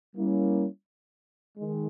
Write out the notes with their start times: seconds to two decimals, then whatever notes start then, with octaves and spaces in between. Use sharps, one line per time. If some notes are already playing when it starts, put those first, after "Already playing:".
0.16 G3 A#3 C#4 E4
1.57 D#3 G#3